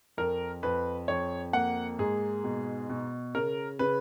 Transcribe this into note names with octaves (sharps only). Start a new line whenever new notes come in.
F2 A#4
F2 B4
F2 C#5
A#3 F#5
G#2 G#4
B2
B2
C#3 A#4
C#3 B4